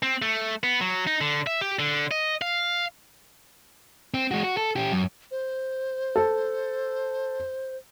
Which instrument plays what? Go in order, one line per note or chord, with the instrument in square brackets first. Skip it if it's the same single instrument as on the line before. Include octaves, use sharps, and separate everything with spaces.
[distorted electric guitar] C4
A3
B3
F#3
D#4
D3
E5
G4
D3
D#5
F5
[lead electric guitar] C4
G#3 F#4
F#4
A4
C#4 G4
F#2
[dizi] C5
[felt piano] A4